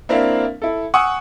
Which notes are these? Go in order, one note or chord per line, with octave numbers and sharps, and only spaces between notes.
A#3 C4 D4 E4 E5 F5
E4 A4
F#5 G#5 C#6 D#6 E6